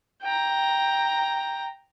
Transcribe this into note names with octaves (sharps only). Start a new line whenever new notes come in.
G5 A#5